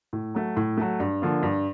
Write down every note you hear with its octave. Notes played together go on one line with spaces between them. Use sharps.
A2
F#3 A3
A2
F#3 A3
G2
D3 F3 A#3
G2